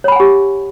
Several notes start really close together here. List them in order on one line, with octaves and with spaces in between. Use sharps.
C#5 B5 G#5 F#5 G4